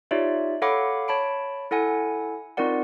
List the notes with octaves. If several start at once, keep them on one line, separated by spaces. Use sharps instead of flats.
D#4 F4 G4 C#5 D5 E5
A4 C#5 F5 F#5 B5 D6
C#5 A5 B5 D7
E4 A4 F#5 G#5
C4 D#4 F4 A#4 D5 F#5